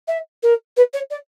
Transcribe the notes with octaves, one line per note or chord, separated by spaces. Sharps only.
E5
A#4
B4
C#5
D5